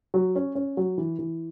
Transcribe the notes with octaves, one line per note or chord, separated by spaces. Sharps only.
F#3
C#4
C#4
F#3
E3
E3